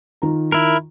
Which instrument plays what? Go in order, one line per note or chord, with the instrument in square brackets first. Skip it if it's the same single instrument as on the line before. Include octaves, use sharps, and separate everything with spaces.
[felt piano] D#3 F4 A#5
[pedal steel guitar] E4 A#4